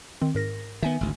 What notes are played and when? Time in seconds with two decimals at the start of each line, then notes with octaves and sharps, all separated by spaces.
0.21 D#3 C4
0.35 G#2 A#4 A#6
0.82 D#3 B3 E5 G#5
1.01 G#1 D2